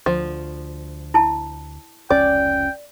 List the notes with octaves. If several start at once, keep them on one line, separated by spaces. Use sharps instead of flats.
D2 F3
E4 A5
F1 C#2 C#4 D5 G5